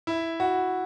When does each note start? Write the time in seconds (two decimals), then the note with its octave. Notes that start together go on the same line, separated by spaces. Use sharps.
0.07 E4
0.40 F#4